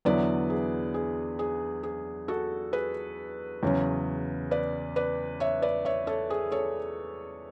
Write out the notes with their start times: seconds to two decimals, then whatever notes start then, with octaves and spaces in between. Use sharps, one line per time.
0.05 E2 D3 F#3 B3 E4 B4 D5
0.50 G#4
0.94 G#4
1.39 G#4
1.83 G#4
2.28 F#4 A4
2.73 G#4 B4
3.63 E2 C#3 F#3 C#4
4.51 B4 D5
4.96 B4 D5
5.40 C#5 E5
5.62 B4 D5
5.85 C#5 E5
6.07 A4 C#5
6.30 G#4
6.52 A4 C#5